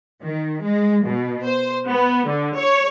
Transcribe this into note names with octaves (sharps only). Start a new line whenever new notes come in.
D#3
G#3
B2
C5
B3
D3
C#5